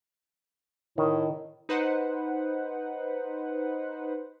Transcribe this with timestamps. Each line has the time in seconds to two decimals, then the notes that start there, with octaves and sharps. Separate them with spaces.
0.98 A2 D#3
1.69 D#4 B4 C5 F#5